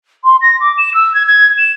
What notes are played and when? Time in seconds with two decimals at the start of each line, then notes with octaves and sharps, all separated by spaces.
0.24 C6
0.42 A#6
0.60 D6
0.78 E7
0.94 E6
1.14 G#6
1.26 G#6
1.58 E7